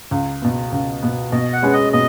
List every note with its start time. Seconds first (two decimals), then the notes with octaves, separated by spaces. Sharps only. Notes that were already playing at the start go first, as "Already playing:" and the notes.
0.11 C#2
0.42 B2 B3
0.72 C#2
1.03 B2 B3
1.32 B2 D#5
1.53 F#5
1.62 G#3 C#4 G#4 B4
1.73 D#5
1.93 B2 D#5